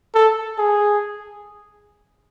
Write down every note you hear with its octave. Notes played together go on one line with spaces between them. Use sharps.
A4
G#4